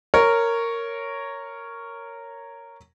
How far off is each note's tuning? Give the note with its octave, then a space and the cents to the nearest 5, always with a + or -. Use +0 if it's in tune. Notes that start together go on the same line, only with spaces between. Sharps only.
A#4 -10 C#5 +0